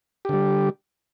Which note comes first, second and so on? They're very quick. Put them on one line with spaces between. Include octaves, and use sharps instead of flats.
G4 D3 G3